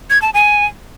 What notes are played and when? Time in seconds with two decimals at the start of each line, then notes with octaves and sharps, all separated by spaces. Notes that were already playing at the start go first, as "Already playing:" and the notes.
0.10 G#6
0.22 A5
0.34 G#5